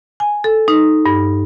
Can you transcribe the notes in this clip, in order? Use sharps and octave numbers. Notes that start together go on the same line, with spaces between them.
G#5
A4
D#4
G2